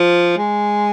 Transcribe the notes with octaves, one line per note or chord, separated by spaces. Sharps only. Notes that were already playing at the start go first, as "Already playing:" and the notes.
Already playing: F3
G#3